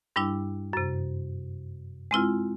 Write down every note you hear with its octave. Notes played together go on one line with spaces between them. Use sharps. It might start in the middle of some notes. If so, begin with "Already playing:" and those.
G2 G3 D4 E4
F#2 C3
G#3 C4 E4 F4